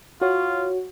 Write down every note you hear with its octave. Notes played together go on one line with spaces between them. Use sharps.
F4 F#4 C#5